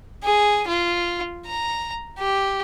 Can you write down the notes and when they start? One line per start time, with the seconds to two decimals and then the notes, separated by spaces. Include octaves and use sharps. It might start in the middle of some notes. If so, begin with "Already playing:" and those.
0.23 G#4
0.68 F4
1.46 A#5
2.19 G4